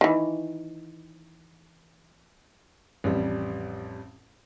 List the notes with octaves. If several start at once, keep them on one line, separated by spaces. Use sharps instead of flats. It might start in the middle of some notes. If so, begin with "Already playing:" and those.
D#3 E3
A1 F2 G3